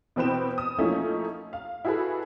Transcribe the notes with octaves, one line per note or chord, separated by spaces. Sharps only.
B2 E3 C4 B4 G5 E7
D#6
F3 A3 A#3 C#4 D#4 E4
F5
E4 F#4 G#4 A4 B4